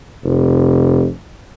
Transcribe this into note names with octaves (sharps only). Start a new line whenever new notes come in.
F1